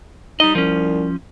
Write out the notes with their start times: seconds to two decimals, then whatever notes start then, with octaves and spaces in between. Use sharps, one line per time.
0.40 G3 D#4 D#5
0.55 C2 F3 C#4